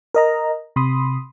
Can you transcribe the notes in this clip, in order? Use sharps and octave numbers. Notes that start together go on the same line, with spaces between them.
A#4 D#5 A#5
C3 B5 C6 D#6